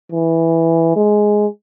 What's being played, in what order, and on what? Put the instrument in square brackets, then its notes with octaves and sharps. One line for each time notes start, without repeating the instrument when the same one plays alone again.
[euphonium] E3
G#3